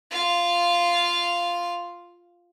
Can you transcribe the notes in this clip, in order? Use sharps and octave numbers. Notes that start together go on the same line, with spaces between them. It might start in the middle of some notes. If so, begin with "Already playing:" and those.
F4 F5